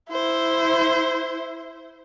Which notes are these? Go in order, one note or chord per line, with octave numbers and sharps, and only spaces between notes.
E4 C5